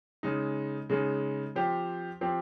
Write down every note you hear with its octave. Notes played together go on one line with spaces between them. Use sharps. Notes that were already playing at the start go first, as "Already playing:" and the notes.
C#3 G#3 D#4
C#3 G#3 D#4
F3 C4 G4 C5
F3 C4 G4 C5